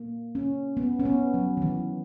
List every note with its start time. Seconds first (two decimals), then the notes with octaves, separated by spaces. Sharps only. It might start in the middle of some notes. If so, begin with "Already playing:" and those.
Already playing: A#3
0.35 C#4
0.77 B3
1.00 C#4
1.05 B3
1.34 F#3
1.57 D#3
1.62 E3